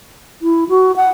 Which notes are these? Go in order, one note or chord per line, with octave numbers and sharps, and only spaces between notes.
E4
F#4
F#5